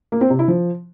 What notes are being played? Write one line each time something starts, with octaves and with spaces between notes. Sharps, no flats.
A#3
C4
C3
E4
F3